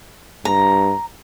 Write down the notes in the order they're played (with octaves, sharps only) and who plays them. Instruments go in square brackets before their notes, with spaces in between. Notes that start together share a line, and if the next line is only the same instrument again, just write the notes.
[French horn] G2 [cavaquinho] A#5